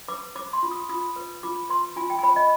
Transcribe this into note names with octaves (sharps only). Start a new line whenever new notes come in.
B4 D6
C5 D6
C6
F4
D#6
F4 D#6
B4
F4 D6
B4 C6
F4 G#5
G5
G#5
C5 B5
D#5